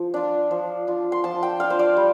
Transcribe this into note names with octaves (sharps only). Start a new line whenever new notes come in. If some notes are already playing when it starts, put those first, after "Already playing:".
Already playing: F3
D4 F4
F3
D4 F4
C6
F3 A5
G5
D4 F4 F5
C5
D5
G3